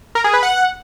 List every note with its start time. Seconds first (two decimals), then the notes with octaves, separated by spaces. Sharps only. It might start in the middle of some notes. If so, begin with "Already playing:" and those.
0.15 A#4
0.24 G#4
0.34 B4
0.43 F#5